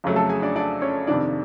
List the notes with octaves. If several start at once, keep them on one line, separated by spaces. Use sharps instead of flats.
F2 C#3 F#3 A3
A4 A5
G#4 G#5
D4 D5
D4 D5
C#4 C#5
F2 C3 D#3 D4 D5